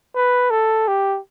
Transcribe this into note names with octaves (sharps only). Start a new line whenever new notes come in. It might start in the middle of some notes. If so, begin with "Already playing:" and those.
B4
A4
G4